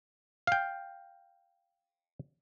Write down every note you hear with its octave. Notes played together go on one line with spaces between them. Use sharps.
F5 G5